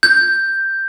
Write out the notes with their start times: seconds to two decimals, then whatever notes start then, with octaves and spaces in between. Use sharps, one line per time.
0.03 G6